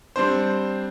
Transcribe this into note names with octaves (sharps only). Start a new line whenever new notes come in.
G3 C4 D4 C5